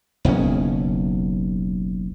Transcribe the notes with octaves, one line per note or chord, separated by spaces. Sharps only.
F#1 B1 E2 C#4